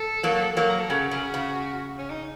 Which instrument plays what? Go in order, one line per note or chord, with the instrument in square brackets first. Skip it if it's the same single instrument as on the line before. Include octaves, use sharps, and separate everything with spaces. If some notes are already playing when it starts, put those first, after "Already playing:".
Already playing: [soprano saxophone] A4
[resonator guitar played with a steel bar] F#3 A#3
F#3 A#3
[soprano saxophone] A#4
A4
[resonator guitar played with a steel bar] C#3 [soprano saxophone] F#4
[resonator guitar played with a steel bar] C#3
C#3
[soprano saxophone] C#4
D#4